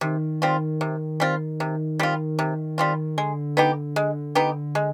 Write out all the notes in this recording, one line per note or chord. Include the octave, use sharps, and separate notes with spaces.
C3 D#3
G3 C4 F4
C3
G3 C4 F4
C3
G3 C4 F4
C3
G3 C4 F4
D3 G#3
B3 D#4 G4
G#3
B3 D#4 G4
G#3